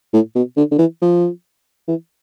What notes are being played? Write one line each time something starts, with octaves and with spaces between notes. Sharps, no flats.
A2
B2
D3
D3
E3
F3
E3